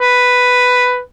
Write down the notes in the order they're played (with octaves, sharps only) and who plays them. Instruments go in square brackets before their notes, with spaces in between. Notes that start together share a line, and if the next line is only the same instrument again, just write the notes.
[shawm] B4